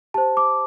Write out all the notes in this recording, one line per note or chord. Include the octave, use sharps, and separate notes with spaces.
G4 C5 A5
D6